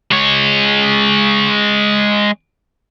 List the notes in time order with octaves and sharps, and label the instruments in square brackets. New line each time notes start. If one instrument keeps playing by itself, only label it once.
[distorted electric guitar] G#3 C#5